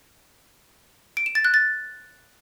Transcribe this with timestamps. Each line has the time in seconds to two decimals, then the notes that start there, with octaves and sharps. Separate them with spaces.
1.17 D7
1.26 E7
1.35 A6
1.45 F#6
1.54 A6